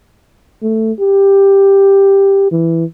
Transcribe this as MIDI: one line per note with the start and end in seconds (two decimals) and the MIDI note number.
0.62 0.92 57
1.00 2.50 67
2.52 2.85 52